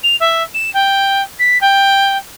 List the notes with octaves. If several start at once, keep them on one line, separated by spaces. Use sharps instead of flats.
F7
E5
E7
G5
B6
G5